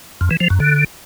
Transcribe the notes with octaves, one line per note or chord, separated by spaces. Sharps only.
F2
E3
F3
F#2
D3